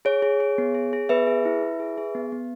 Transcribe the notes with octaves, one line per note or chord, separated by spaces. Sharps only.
G#4 C#5
G#4
G#4
B3
G#4
G#4
B3 B4 E5
G#4
E4
E4
G#4
G#4
B3
B3